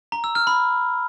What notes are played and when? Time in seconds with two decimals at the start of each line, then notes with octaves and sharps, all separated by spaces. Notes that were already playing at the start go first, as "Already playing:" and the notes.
0.12 A#5
0.24 E6
0.35 F6
0.47 B5